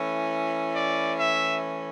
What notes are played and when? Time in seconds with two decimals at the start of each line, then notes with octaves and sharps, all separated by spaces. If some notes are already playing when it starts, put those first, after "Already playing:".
Already playing: E3 A3 C#4 E4
0.74 D5
1.18 E5